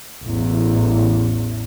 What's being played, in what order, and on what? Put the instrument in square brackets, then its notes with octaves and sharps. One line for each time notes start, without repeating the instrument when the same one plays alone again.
[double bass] A1 E2